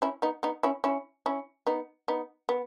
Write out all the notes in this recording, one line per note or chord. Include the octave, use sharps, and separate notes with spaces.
C#4 E4
B3 D#4
B3 D#4
C#4 E4
C#4 E4
C#4 E4
B3 D#4
B3 D#4
B3